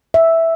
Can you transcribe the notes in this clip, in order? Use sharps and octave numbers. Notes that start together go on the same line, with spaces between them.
E5